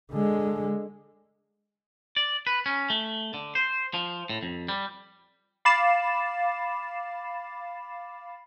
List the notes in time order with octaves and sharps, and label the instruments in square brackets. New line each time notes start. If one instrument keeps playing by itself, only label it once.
[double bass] D3 G#3
[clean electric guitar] D5
B4
C#4
A3
D3
C5
F3
A2
F2
G3
[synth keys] F5 B5 D6 A6 C7 E7